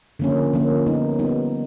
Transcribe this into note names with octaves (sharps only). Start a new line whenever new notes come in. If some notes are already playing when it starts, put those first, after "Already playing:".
D3 F3 A#3 C#4
D3 F3 A#3 C#4
G3 B3 D#4
G3 B3 D#4